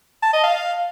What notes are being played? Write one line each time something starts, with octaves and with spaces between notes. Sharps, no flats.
A5
D#5
F5